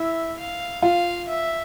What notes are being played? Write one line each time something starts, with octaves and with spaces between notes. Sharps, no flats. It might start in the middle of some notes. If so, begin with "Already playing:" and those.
Already playing: E4 E5
F5
F4 F5
E5